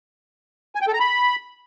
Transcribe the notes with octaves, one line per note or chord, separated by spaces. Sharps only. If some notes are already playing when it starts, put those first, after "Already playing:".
G#5
G5
A4
A#5
B5